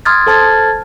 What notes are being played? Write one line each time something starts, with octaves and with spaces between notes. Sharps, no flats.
C6 D#6 F6 G#6 A6
A4 C5 A5 F6 G#6 A6